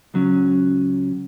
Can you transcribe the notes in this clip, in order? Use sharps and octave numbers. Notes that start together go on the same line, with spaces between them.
C#2 F#3 C#4